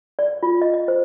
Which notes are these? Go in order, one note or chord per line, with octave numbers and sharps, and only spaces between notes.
D5
F4
D#5
D#5
C5